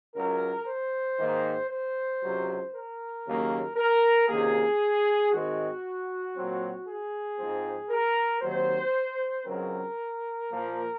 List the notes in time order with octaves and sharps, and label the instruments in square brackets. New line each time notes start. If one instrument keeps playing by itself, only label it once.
[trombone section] C#2 C#3 F#3 A#4
C5
G#2 D#3 A#3
C5
C#2 C3 F#3
A#4
D#2 C#3 F#3 A#3
A#4
C#2 C3 D#3 A#3 G#4
G#2 D#3 G#3 C4 F#4
A#2 F#3 C4
G#4
G#2 F3 C4
A#4
D#2 D#3 F#3 C4 C5
C#2 C#3 F#3 C4 A#4
A#2 F3 A#3